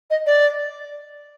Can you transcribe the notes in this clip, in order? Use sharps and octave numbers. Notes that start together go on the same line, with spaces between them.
D#5
D5